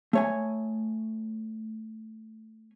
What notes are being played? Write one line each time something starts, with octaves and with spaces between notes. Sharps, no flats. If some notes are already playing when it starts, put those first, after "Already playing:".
A3 C#5 G#5